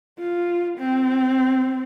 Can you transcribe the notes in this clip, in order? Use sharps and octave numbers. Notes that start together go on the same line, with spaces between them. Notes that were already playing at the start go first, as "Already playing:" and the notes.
F4
C4